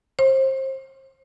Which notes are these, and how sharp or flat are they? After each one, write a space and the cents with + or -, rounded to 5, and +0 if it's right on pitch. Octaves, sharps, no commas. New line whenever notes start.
C5 +30